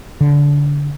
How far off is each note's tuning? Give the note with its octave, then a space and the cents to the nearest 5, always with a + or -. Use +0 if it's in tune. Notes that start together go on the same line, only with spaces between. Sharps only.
D3 -25